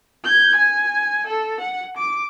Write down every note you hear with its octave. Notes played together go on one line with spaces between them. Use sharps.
G6 G#6
G#5
A4
F#5
D6